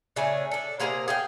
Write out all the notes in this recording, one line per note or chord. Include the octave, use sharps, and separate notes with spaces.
C#3 A3 D4 G#5
D4 A4
C3 A#3 G#4 A#5
G#4 F5 G5